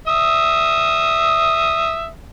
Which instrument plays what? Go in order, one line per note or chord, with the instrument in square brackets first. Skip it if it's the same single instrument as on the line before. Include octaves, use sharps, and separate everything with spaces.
[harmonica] E5 D#6